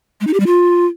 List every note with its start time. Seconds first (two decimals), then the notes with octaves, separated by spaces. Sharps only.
0.21 G#3
0.27 D#4
0.33 G4
0.40 G3
0.46 F4